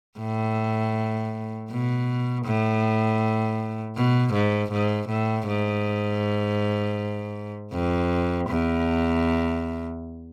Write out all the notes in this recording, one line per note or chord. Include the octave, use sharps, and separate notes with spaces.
A2
B2
A2
B2
G#2
G#2
A2
G#2
F2
E2